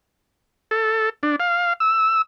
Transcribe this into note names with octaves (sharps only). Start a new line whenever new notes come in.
A4
D4
F5
E6